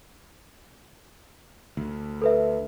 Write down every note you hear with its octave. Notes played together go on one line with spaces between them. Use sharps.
D2
A4 B4 E5